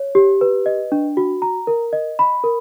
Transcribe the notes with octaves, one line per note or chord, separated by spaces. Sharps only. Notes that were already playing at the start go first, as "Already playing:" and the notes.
Already playing: C#5
G4
B4
D#5
D4
F#4
A#5
A#4
D#5
B5
A#4